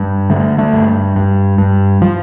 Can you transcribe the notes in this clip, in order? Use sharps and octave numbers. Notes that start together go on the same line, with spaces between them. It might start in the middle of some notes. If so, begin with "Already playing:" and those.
Already playing: G2
D3 A3
A3
G2
G2
G2
F3